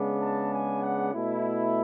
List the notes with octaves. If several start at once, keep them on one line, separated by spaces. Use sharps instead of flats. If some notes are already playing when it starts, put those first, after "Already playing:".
Already playing: C#3 G#3 B3 D4
A5
G#5
F#5
B2 A3 E4